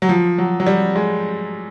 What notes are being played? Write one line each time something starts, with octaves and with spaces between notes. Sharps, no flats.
F#3
F3
F#3
F#3
G3
G#3